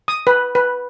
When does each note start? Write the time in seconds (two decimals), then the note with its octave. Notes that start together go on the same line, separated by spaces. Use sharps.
0.08 D#6
0.27 B4
0.55 B4